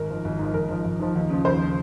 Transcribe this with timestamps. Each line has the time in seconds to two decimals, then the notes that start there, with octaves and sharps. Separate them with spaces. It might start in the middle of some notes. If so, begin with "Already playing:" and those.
Already playing: G#1 A#4
0.09 G#2 F3
0.25 G#1
0.39 G#2 F3
0.54 G#1 A#4
0.69 G#2 F3
0.85 G#1
0.99 G#2 F3
1.15 D#2
1.29 C#3 F3
1.45 D#2 C5
1.60 C#3 F3